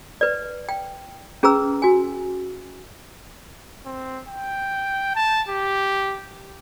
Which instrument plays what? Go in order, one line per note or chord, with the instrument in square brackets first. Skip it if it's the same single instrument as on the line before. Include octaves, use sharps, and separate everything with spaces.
[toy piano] B4 D5
G5
C#4 G#4 B4 A#5 E6
F#4 G#5
[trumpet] C4
G5
A5
G4